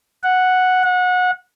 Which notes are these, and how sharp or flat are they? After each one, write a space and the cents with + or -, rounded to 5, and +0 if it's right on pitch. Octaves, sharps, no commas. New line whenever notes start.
F#5 -5
F#5 -25